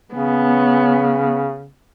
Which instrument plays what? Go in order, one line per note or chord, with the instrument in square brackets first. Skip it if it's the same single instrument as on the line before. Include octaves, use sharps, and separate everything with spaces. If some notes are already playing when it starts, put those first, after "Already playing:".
[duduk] C#3 [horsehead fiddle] B3 C#4